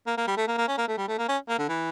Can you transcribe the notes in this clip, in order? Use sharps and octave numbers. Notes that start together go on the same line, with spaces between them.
A#3
A#3
G3
A3
A#3
A#3
C#4
A#3
A3
G3
A3
A#3
C#4
A#3
D3
E3